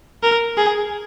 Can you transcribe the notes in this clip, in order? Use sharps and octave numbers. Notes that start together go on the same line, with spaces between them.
A#4
G#4